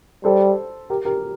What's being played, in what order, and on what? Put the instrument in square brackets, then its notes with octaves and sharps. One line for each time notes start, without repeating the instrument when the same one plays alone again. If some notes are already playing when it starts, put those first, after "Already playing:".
[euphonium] G3 [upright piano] A4 C5
[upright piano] G4 A#4
G4 A#4